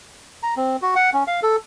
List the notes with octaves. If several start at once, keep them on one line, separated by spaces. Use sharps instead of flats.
A#5
C4
F#4
F#5
C#4
F5
A4